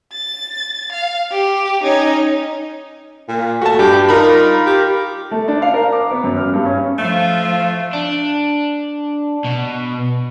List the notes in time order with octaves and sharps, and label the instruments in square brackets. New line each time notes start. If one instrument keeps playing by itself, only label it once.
[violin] A6
F5
G4
C#4 D#4
[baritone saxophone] A#2
[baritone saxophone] A3 [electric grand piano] F#4 A5
[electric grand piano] G2 [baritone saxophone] G4
[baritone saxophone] D#4 [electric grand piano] F4 A#4 B5
[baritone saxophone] G4
[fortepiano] A3
D4
F5
A#4
D6
B3
F#2
F6
G2
C#4
[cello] F3 F4 [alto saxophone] A3
[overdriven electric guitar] D4
B2